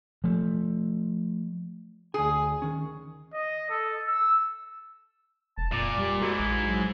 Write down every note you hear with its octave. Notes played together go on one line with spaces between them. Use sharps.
F3 A3
D2 G#4 G#5
D#3 C#4
D#5
A4
E6
F1 A5
F2 A#2 D5
F1 G3
G#2 A3 E4 F#4
A#1
F#3